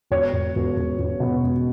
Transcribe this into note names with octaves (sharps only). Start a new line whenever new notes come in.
E1 C#5
E1
E1
E1
E1
B2
E1